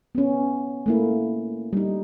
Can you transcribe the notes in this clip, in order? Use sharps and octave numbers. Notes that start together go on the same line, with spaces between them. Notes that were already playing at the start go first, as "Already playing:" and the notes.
B3 C#4
A3 A#3 E4
G3 D#4